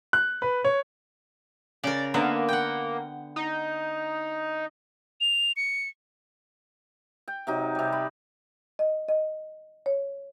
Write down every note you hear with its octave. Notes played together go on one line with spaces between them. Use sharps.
F#6
B4
C#5
C#3 A#4 D5
D3 A#3 B3 E5
F#5 G5
D#4
F7
C#7
G5
C3 F#3 D#4
C3 G3
B5
D#5
D#5
C#5